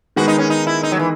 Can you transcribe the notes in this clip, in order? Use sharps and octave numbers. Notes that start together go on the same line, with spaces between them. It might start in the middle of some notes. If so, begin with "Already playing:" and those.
D#3 G#3 B3 F#4
D#4
C#4
D#4
E4
D#4
F#3
E3